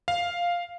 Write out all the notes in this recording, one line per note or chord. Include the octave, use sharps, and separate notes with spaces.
F5